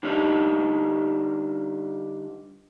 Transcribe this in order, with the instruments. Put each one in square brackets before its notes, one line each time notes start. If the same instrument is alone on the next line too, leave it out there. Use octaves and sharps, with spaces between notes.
[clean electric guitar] D3 G3 D4 D#4